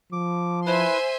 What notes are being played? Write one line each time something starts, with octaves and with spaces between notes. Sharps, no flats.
F3 D6
E4 B4 C5 E5 G#5 C6